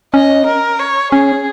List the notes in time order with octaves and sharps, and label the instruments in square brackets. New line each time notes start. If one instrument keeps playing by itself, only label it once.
[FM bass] C#4 [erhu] D#5
[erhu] A#4
C#5
[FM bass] C#4 [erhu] G#4